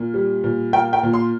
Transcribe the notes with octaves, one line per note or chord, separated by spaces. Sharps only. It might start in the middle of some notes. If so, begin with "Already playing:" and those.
Already playing: A#2 A#3
G3
A#2
A#3 G5
G5
A#2
C6